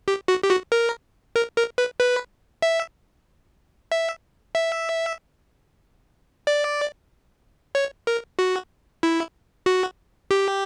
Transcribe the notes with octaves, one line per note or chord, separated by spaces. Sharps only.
G4
F#4
G4
F#4
A#4
A#4
A#4
B4
B4
E5
E5
E5
D5
C#5
A#4
F#4
E4
F#4
G4